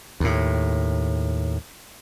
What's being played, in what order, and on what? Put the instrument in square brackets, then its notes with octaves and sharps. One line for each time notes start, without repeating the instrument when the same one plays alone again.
[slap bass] D#2 A2